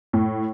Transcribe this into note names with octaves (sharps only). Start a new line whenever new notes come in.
A2